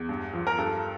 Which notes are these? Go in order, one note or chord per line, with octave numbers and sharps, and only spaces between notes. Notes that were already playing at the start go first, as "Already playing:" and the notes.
Already playing: E2
G2
F3
A#4
G2 A4